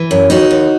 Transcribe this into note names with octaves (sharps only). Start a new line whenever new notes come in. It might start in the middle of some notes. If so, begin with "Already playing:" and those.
Already playing: E3
F#2
D#2 D#4 F#4
D#2